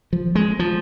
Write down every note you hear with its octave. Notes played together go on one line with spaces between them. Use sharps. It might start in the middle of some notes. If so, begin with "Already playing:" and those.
F3
G#3
F3